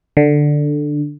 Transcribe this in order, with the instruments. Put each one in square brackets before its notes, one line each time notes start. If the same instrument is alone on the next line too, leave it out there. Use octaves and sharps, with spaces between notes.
[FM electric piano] D3